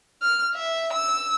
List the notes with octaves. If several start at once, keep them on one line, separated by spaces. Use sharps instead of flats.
F6
E5
E6